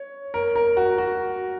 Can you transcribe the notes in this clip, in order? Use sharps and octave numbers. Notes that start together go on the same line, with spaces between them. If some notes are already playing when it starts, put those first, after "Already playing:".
Already playing: C#5
A#4
A#4
F#4
F#4